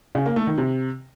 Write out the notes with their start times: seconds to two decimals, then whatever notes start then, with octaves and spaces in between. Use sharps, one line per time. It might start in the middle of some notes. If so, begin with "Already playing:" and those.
0.15 C#3
0.26 A#3
0.36 A3
0.47 D#3
0.58 C3